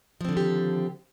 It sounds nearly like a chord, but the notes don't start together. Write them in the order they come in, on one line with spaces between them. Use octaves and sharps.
F3 C4 D3 D#3 G4